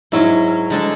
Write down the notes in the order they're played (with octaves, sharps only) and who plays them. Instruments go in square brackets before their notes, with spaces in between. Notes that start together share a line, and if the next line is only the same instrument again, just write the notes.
[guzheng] G#2 F#3 C#4 [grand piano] E4
[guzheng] D3 G#3 D4 A4